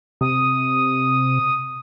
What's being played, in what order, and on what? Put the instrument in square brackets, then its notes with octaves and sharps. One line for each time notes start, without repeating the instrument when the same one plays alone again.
[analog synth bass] C3 [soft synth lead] D#6